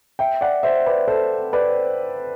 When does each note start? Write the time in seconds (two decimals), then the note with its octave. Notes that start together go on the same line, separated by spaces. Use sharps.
0.19 E5 G5
0.41 D5 F#5
0.63 C5 E5
0.86 B4 D5
1.08 A4 C5
1.53 B4 D5